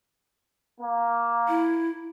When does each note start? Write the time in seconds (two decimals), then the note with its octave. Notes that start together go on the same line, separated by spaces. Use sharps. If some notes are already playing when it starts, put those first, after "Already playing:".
0.81 A#3
1.48 E4